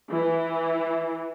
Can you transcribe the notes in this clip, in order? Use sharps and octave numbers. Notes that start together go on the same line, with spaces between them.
E3